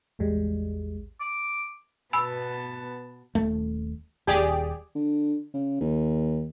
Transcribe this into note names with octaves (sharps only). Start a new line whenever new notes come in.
A1 E2 G3 G#3
D6
B2 B3 G#5 A5 B5 E6
D#1 A3
D#1 G4 G#4 D5
D3
C#3
D#2